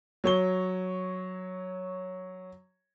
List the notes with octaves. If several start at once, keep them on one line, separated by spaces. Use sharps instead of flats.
F#3 C#5 G7